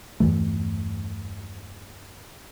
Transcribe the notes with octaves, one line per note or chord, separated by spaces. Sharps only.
E2 G2 E3 A3